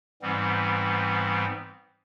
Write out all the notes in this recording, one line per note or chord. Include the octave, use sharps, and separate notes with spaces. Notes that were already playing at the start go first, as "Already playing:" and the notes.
G#2 E3 G3 B3 C4